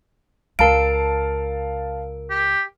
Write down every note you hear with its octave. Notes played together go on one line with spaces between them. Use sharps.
C#2 A#4 F5 A5 D7
G4